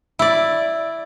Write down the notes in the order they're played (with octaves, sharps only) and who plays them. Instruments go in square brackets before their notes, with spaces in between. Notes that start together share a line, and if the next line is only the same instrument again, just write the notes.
[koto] E4 D5